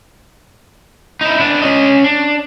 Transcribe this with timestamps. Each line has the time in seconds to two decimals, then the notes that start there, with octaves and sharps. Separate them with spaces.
1.21 D#4 E4
1.40 B3 D4
1.62 C#4 D#5
2.04 D4